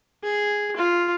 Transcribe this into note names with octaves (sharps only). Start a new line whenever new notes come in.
G#4
F4